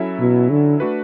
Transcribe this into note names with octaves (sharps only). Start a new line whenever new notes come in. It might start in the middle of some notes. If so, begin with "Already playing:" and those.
Already playing: F#3 C#4 E4 A4 E5
B2
D3
A3 D4 F#4 B4